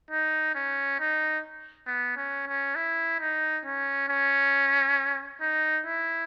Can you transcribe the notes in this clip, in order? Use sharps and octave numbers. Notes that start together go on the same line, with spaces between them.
D#4
C#4
D#4
B3
C#4
C#4
E4
D#4
C#4
C#4
D#4
E4